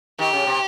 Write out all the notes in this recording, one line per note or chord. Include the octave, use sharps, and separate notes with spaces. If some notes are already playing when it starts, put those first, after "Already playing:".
D#3 G4
C#3
C3